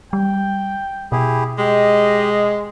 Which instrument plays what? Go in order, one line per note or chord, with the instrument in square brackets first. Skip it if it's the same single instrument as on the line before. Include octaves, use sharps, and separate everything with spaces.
[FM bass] G3 [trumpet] G5
[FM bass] B2 [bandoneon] E4 G4 G#4
[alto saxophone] G#3 [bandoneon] G4 [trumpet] D#5